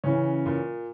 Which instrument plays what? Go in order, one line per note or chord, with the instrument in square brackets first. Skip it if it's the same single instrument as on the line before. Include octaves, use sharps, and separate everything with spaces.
[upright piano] C#3 E3 [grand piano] C#4
[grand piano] A#2